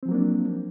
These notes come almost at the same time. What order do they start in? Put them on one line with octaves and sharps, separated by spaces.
C4 F3 F#3 A#3 D4